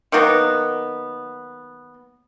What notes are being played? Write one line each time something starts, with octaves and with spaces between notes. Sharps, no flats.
D#3 F#3 A#3 B3